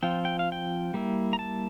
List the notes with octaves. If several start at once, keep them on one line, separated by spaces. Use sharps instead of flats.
F3 C4 F4 G5
G5
F5
G5
G3 A#3 E4
A#5
A5